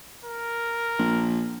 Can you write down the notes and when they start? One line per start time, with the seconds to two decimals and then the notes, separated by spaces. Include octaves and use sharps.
0.25 A#4
0.98 A#1